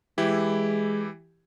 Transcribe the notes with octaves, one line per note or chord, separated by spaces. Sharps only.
E3 G#3 E4 G4